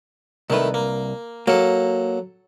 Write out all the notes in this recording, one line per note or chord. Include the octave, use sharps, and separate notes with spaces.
C2 D#3 A3 B4
A#3
F#3 A#3 A4